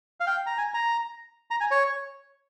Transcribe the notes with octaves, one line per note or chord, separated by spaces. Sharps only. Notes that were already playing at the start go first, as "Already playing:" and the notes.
F5
G5
A#5
G#5
A#5
A#5
G#5
C#5